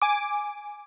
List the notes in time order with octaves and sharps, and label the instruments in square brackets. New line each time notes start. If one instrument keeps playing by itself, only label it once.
[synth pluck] G#5 D6